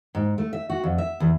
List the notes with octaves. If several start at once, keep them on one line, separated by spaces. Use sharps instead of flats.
G#2
A3
E5
F#4
F2
E5
E2